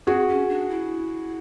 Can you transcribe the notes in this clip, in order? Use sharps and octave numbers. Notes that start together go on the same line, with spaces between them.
C4 F#4 G#4
C#4
D4
E4